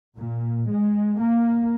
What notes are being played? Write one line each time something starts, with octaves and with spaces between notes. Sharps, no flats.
A#2
G#3
A#3